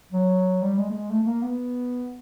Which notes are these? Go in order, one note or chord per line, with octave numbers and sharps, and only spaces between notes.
F#3
G3
G#3
A3
G#3
A3
A3
A#3
B3